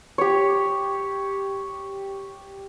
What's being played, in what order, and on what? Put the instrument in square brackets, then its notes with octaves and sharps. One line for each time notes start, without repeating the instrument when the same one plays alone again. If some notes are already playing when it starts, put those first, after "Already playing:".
[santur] G4 C#5